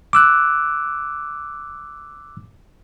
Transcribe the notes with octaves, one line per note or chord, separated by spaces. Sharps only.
D6 E6 F#6